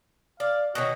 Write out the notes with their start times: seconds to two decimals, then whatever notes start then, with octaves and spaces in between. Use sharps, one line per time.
0.40 D5 F5
0.75 B2 D#3 C#4 F#4